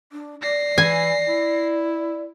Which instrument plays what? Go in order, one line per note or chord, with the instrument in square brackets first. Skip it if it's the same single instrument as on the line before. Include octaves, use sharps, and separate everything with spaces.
[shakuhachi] D4
[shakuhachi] D5 [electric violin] A#6 C7
[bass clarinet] E3 [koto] G#5
[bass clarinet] E4